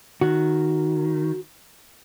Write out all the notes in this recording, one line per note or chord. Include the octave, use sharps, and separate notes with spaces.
D#3 F#4